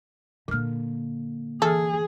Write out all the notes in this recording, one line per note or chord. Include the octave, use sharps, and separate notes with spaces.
A#2 D3 A#3 F6
E3 G#4 A4 F6